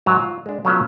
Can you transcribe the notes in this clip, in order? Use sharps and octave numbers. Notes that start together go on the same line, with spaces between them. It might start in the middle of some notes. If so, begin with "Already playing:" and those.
G#2 F#3 A#5
F4
G#3 D4
F#3 A3 B3 C#4 F4